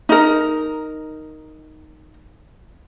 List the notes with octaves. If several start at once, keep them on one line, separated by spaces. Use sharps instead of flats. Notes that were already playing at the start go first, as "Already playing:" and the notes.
D#4 A#4